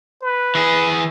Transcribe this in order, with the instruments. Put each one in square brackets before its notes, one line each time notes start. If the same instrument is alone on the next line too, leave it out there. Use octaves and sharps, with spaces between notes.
[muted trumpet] B4
[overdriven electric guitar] E3 G#4